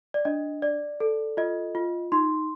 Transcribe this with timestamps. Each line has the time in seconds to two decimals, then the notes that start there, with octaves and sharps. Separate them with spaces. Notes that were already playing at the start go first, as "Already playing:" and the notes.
0.14 D5
0.25 D4 D#5
0.62 D5
1.00 A4
1.37 F4 D#5
1.75 F4
2.12 D#4 C6